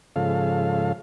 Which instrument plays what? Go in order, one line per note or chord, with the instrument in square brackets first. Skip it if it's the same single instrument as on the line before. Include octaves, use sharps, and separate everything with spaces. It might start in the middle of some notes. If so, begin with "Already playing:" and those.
[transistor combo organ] G#2 C#3 F3 A4 F5